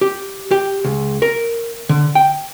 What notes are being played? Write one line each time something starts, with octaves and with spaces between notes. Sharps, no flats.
G4
G4
C#2
A#4
D3
G5